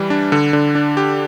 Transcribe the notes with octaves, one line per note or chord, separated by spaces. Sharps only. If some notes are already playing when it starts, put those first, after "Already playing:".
Already playing: E3 G3
D4
D3
D3
D4
G4